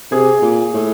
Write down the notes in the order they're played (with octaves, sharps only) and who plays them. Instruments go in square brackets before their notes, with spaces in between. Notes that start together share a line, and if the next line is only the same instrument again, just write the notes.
[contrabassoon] C3 [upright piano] G#4
[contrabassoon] A#2
A2